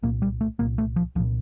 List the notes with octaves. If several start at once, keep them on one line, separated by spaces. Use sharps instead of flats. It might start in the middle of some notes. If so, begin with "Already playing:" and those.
C2 A#2 A#3
G3
A3
C2 A#2 A#3
A3
F3
C2 A#2 F3